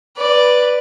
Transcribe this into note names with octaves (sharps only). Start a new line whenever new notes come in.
B4 D5